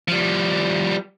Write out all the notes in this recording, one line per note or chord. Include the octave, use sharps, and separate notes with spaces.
F3 G3